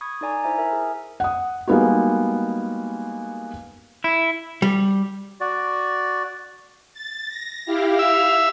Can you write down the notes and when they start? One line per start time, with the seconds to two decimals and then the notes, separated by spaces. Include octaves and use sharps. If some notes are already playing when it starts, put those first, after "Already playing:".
0.01 B5 C#6 D#6 G#6
0.21 D#4 A4 D5 G#5 A#5
0.44 E4 C5 E5 G#5 A#5
0.58 A#4 E5 G#5
0.73 G#4
1.20 F#5 D#6
1.68 G3 G#3 A#3 B3 D#4 F#4
4.04 E4
4.62 G3
5.41 F#4 D5
6.93 A6
7.28 A#6
7.66 E4 G4 F5
7.99 E5 F5 F6